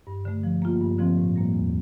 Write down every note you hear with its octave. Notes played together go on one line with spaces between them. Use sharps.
G2
D3 A3
F3
A#3 F4
G2
D3 F3 C4
A2
G3 A#3
E2